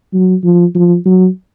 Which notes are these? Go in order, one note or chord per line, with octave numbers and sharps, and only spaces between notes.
F#3
F3
F3
F#3